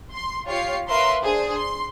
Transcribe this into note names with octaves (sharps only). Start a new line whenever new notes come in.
C6
F4 G4 C#5 F5 C7
A#4 B4 C#5 E5 F5 C6
D4 G#4 C5
C6